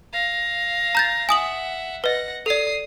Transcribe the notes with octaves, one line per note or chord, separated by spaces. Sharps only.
F5 A#6
A#5 G6 A6
E5 F#5 G#5 D#6 F#7
B4 D#5 F#5 A#6
A4 D5 D#6 C7